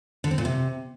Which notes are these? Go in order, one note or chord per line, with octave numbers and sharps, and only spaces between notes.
D3
C4
A#2
C3